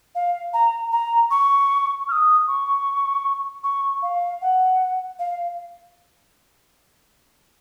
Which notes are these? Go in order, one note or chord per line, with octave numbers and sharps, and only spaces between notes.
F5
A#5
A#5
C#6
F6
D#6
C#6
C#6
F5
F#5
F5